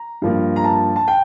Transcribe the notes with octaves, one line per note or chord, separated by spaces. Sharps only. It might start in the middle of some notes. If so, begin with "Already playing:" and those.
Already playing: A#5
G2 F3 A#3
A#5
A5
A5
G5